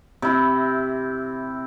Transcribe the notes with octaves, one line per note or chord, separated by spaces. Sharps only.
C3 E4